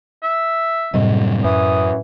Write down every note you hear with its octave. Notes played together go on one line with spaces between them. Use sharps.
E5
F#2 A2 C3 G3 D#5
F#2 E3 D#6